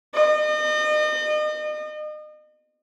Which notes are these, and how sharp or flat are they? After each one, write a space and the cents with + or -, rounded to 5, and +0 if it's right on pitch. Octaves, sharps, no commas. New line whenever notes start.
D#5 -35